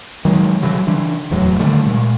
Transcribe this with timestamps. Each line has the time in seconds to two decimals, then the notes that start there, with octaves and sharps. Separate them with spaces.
0.25 D#3 F#3 G#3
0.62 C#3 E3 F#3 G3
0.87 C#3 E3 D4
1.30 D1 E2 A2 F#3
1.59 D3 D#3 G3 A3
1.86 A#2 G#3